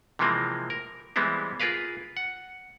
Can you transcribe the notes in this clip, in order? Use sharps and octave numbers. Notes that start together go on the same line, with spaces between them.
C3 E3 F3 G#3 A#3 C4
A#4
E3 G3 G#3 B3 C4 E4
F4 G#4 A#4 B4 F5
F#5